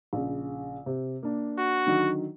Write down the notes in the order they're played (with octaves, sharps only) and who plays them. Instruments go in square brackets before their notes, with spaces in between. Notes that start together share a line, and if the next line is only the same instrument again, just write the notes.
[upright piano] A#1 C#3
C3
A#3 D4
[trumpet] F#4
[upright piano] D3 D#3 F#3